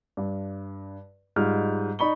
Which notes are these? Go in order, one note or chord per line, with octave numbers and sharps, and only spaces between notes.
G2
G#2 G3 F4 F6
D#4 D5 B5 C#6 G7